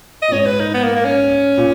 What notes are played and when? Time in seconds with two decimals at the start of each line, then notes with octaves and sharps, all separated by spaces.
0.22 D#5
0.28 A#2
0.32 G#2 C#5
0.46 B4
0.60 D#4
0.74 B3
0.84 A#3
0.95 A#3
1.05 C#4
1.58 A#2